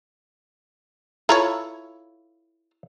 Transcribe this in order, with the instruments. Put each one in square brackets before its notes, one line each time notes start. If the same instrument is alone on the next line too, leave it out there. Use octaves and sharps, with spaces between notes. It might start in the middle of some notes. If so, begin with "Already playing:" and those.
[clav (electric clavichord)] E4 A4 C#5 [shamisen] F4 B4 A#5